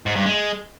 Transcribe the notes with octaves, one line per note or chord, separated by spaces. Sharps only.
G#2
G2
G#3